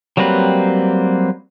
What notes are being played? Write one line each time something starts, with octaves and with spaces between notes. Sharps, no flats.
F#3 G3 A#3 C4 B4